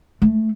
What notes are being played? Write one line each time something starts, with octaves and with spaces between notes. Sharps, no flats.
A3